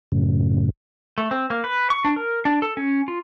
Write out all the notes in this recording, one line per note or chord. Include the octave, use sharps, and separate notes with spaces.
F#2 A2 C#3
A3
C4
A#3
B4
C#6
D4
A#4
D4
A4
C#4
F4